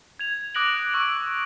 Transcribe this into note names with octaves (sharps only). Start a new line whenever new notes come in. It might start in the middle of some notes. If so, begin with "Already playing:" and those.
G#6 F7
D6 D#6 F#6 A#6 D7 F#7
C#6 E6 D7